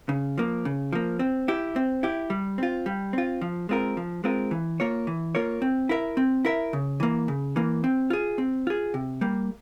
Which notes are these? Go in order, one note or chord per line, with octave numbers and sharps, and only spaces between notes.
C#3
F3 A#3
C#3
F3 A#3
C4
E4 G4
C4
E4 G4
G3
C4 F4
G3
C4 F4
F3
G#3 C4 F4 A#4
F3
G#3 C4 F4 A#4
E3
A#3 F4 A#4 C#5
E3
A#3 F4 A#4 C#5
C4
E4 A#4 E5
C4
E4 A#4 E5
C#3
E3 A#3
C#3
E3 A#3
C4
F4 G#4
C4
F4 G#4
C3
G3 A#3